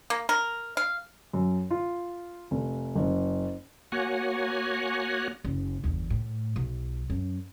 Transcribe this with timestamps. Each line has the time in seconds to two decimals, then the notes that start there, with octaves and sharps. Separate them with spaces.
0.10 A#3
0.29 A#4
0.77 F5
1.33 F#2
1.71 F4
2.51 F1
2.95 F#1
3.92 A#3 F#4 C#5 F#5 G#5
5.44 F#1
5.83 G1 E2
6.10 A2
6.56 B1
7.10 F#2